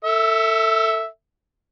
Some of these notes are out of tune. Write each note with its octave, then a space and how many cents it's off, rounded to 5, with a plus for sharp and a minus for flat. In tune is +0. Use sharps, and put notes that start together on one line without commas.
A4 +25 E5 -5